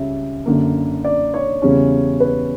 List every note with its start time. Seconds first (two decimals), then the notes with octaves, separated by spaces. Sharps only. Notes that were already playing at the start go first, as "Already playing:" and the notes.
Already playing: C#2 C#3 G3 C#4 E5
0.46 F#2 D3 A#3
1.05 D5
1.34 C#5
1.62 E2 C#3 G3 C#4
2.20 B4